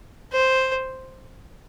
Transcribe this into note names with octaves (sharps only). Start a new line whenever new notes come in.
C5